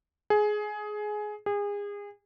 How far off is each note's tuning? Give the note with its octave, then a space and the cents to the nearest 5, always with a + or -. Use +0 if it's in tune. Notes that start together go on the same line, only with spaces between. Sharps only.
G#4 +15
G#4 -30